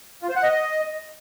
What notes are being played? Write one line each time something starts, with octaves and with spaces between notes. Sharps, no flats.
F4
C5
F#5
D#5